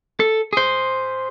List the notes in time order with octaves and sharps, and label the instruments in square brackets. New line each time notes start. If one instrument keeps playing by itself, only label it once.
[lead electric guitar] A4
G#4 C5